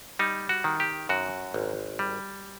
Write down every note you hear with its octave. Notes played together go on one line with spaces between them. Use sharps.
G3 D#4
F#4
D#3
G4
F#2 F#4
G#1
G3